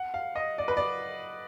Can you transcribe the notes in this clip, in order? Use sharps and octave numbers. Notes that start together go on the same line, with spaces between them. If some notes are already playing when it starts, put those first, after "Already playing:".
Already playing: F#5
F5
D#5
D5
B4
D5